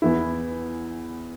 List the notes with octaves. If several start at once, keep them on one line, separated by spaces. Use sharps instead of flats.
E2 E3 B3 E4